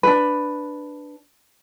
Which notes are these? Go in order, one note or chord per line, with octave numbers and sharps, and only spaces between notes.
D4 B4